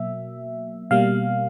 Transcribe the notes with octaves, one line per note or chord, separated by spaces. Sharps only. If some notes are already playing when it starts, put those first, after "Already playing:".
Already playing: B2 F#3 A#3 E5
B2 G3 A#3 F5